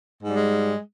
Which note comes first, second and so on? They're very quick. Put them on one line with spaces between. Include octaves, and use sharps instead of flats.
G#2 G3 G#3